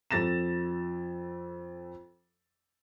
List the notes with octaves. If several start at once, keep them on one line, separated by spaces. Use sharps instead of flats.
F2 A4 A6 A#6 E7